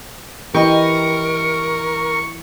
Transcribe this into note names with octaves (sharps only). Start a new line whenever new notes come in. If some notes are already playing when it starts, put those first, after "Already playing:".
E3 G4 A#4 B4 D#5 C#6